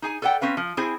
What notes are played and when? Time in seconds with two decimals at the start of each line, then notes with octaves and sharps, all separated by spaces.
0.02 D#4 G#4 G#5
0.22 A4 B4 D5 F#5 G5
0.41 C4 C#4 B4 F5
0.57 F3
0.77 C4 E4 G#4 C5 G#5